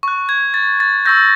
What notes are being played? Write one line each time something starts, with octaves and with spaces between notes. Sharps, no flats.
C#6 F#6
G#6
A6
A6
C#6 E6 G6 A#6